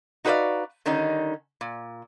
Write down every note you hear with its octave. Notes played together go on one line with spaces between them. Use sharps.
D#4 F#4 B4 C5 D5 F5
D3 D#3 G3 C#4 D#4
A#2